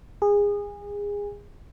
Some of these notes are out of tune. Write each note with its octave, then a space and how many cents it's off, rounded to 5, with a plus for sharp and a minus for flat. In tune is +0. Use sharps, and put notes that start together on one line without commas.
G#4 -25